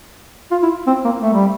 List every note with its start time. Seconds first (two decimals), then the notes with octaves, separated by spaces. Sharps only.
0.51 F4
0.62 E4
0.87 C4
1.05 A#3
1.22 A3
1.33 G3